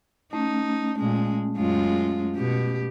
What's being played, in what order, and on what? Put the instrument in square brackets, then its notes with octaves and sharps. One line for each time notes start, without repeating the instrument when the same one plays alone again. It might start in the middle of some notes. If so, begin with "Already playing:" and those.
[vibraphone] A3 C#4 [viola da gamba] D#4
[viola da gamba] A#2 G#3
F#2 G#3 F4
B2 G4